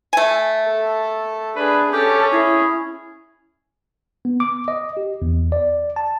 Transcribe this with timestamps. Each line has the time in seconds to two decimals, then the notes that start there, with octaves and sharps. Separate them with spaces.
0.13 A3 G#5
0.66 A4
1.56 D4 G#4 B4
1.93 C#4 G4 A4
2.32 E4 G#4
4.25 B3
4.40 D6
4.68 D#5
4.97 G4
5.22 E2
5.52 D5
5.96 A5